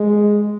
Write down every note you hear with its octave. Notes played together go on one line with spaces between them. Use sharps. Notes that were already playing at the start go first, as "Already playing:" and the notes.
Already playing: G#3